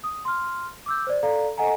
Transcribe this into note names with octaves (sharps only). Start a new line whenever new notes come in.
D#6
C6 F6
D6 E6 G6
C5 D5
A4 D5 F5 A#5
A4 D#5 F#5 G#5 A#5